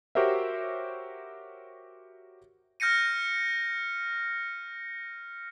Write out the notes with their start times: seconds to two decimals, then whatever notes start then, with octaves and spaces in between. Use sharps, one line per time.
0.15 F#4 G4 A#4 C5 C#5 E5
2.80 F6 G6 A#6 C#7 D#7